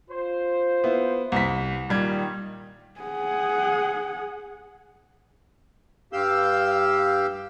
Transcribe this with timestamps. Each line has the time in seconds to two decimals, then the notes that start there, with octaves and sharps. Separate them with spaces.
0.11 F4 C5
0.84 B3 E4
1.32 C2 B6
1.89 A#2 D#3 G3 G#6
3.00 G#4 F#5
6.13 G2 G4 F5 E6 G6